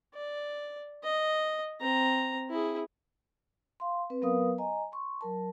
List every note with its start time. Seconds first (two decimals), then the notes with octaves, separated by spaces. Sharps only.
0.14 D5
1.03 D#5
1.80 C4 A#5
2.50 E4 G#4
3.80 F5 C6
4.10 C4 B4
4.22 F#3 B3 A#4 B4 F5 D#6
4.58 D#5 G#5 A#5
4.92 C6 C#6
5.21 F#3 A#4 A5